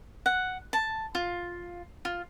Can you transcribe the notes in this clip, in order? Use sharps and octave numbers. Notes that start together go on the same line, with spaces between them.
F#5
A5
F4
F4